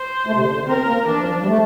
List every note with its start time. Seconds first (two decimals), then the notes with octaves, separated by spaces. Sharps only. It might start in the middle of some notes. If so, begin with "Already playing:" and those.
Already playing: C5
0.27 A3
0.35 C3
0.40 D3
0.54 D3
0.67 C4 A#4
0.87 A#3
1.06 E3 D4
1.20 F3
1.33 F3
1.42 G3
1.46 A3